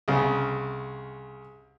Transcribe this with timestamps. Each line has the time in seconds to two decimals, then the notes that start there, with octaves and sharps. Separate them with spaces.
0.08 C2 C#3